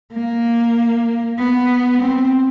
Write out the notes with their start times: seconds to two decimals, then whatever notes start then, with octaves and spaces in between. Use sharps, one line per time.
0.12 A#3
1.38 B3
2.01 C4